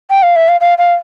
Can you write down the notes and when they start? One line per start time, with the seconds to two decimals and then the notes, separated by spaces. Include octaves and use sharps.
0.10 G5
0.23 F5
0.36 E5
0.48 F5
0.61 F5
0.78 F5